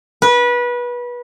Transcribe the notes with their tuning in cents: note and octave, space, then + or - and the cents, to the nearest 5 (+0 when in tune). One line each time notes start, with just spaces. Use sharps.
B4 -25